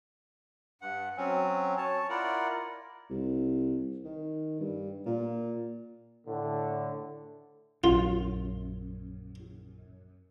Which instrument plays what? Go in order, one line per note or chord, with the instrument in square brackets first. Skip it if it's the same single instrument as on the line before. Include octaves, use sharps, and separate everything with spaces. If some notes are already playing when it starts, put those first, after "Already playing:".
[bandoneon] G2 F#5
F#3 C4 C#4
C#5 A5
E4 F4 A#4 D5 F#5
[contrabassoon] C2
D#3
G2
A#2
[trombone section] A2 D3
[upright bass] A#1 [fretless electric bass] F#2 [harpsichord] F4